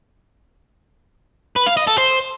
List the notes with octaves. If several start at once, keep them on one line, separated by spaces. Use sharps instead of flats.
B4
F5
D#5
A4
C5